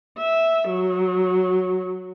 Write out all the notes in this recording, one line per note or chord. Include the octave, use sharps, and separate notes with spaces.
E5
F#3